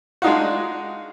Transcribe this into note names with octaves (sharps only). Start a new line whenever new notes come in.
G#3 D4 D#4 F4 F#4